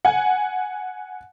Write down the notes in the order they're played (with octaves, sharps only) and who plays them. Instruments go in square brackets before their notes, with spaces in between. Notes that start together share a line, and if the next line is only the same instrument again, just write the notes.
[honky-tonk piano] F#5 G#5